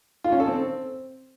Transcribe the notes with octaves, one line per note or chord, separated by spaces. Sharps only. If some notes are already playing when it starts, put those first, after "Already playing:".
F4
C#4
A4
C4